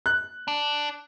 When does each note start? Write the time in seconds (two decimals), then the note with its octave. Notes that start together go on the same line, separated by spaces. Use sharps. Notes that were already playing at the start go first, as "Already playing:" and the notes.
0.06 F#6
0.48 D4